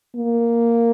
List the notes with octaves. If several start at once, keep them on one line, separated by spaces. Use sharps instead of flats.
A#3